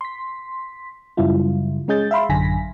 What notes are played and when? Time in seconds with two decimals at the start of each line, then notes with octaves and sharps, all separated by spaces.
0.01 C6 B6
1.17 F#2 C#3 G3 E4 F4
1.88 G#3 C#4 G#4 D#5 G6 A6
2.11 E5 F5 B5 C6
2.29 A1 F#2 D3 G#5 A#6 B6